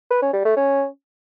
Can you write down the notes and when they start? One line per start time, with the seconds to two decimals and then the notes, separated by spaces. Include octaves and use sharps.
0.10 B4
0.22 C#4
0.34 G3
0.45 A3
0.57 C#4